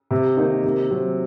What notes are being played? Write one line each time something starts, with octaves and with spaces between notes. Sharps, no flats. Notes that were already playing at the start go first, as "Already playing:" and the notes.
C3
D#3 A#3 D#4
C3
F#3 C4